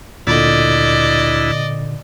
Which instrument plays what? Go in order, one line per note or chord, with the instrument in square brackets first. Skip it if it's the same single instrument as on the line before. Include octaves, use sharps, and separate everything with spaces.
[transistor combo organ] D2 E4 [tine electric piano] A#2 D3 [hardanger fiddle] D5 D#5